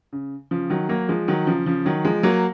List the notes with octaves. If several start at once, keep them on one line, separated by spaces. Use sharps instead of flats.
C#3
C#3 F3
D#3 F#3
F#3 A#3
F3 G#3
D#3 F#3
C#3 F3
C#3 F3
D#3 F#3
F3 G#3
F#3 A#3